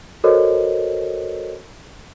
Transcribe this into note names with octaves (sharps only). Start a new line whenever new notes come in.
F#4 A4 A#4 C5 C#5 D#5